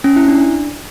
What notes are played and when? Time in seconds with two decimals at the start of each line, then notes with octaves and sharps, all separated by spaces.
0.04 C#4
0.16 E4
0.28 D4